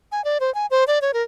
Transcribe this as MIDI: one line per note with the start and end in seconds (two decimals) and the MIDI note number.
0.12 0.24 80
0.25 0.38 74
0.40 0.53 72
0.54 0.66 80
0.71 0.84 72
0.87 0.99 74
1.02 1.12 73
1.14 1.23 70